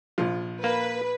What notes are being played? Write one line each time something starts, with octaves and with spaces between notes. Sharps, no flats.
A#1 F3
A#3 B4